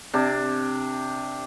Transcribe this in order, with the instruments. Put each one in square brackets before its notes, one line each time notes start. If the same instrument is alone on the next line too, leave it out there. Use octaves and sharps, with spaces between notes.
[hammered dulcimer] C3 D4